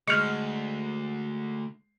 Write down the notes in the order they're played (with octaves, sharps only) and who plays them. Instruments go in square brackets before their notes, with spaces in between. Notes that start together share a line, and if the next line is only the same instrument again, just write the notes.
[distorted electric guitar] D2 [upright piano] G#3 [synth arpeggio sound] C#6 F6